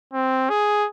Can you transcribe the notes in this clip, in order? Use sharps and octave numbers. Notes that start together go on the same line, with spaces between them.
C4
G#4